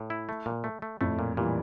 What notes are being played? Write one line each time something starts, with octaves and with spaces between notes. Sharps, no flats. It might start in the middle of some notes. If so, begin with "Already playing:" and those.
Already playing: A2
E4
A3
A#2
A3
A3
F2 A2 A3
A#2
A#2 E3 G3